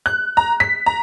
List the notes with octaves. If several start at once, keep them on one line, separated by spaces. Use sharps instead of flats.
F#6
A#5
B6
A#5